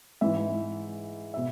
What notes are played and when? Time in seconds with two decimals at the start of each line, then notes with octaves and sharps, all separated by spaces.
0.21 G#2 E3 E5
1.34 B2 E5